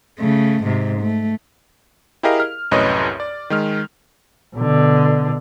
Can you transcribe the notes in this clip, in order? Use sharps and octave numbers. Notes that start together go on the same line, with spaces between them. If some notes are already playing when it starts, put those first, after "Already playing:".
C#3 A3
G#2 C3
A3
E4 G4 G#4 A#4 D#5 F5
F6
C2 F#2 A2 B4 C#5 D#5
D5
D#3 G#3 F6
B2 D3